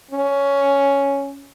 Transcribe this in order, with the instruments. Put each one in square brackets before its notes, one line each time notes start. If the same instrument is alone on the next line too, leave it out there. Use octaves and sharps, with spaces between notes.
[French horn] C#4